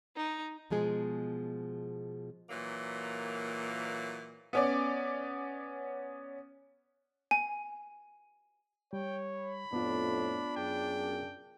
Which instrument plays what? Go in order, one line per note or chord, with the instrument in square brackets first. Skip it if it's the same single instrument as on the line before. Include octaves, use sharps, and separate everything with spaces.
[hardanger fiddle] D#4
[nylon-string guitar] B2 F3 G#3 G#4
[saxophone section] A#2 E3 F#3 A#3
[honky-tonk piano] B3 C#4 D5
[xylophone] G#5
[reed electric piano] G3 [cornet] C#5 [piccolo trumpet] G5
[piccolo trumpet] B5
[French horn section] F2 A2 [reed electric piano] B3 F4 [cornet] D4
[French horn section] F#2 G#4 [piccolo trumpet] G5